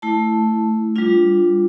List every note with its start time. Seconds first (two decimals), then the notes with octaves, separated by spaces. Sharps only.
0.02 A3 E4 A5
0.96 G3 D4 F4